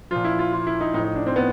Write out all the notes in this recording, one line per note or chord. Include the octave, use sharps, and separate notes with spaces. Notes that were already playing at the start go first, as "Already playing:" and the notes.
A#2 F3 F4
E4
F4
F4
E4
D#4
A2 F3 D#4
D#4
D4
C4
B3